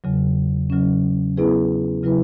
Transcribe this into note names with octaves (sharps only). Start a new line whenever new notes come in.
E2 C#3 F#3
C#3 F#3 C#4
F#3 B3 E4 G#4 B4
C#3 F#3 E4 B4